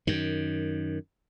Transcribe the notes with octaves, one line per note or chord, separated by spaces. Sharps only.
F#2 D#3